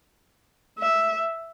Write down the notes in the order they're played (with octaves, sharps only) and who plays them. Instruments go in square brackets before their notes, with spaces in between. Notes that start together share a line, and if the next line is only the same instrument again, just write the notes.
[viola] E5